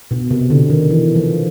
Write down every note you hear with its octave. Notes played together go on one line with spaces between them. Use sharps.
B2
C3
D3
D#3
E3
F3